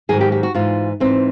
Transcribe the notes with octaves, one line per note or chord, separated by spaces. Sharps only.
G#2 D#3 F#3 G#4
G4
G4
F#4
G#2 E3 F4
G#2 E3 C4